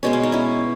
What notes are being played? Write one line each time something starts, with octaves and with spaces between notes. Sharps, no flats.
B2 G#3 B3 C#4
C#4
D#4
C#4 E4